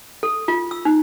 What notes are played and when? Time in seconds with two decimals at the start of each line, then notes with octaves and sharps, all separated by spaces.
0.23 A4
0.48 F4
0.71 E6
0.85 D#4